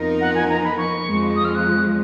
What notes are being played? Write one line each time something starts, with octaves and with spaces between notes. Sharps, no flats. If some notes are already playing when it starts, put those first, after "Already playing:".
Already playing: F2 F3 B3 D#4 A#4
F#5
G#5
A#5
B5
C#6
F2 F3 G#3
D#6
F6
F#6